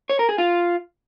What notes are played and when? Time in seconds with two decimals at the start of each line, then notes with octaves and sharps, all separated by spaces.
0.10 C#5
0.19 A#4
0.29 G#4
0.38 F4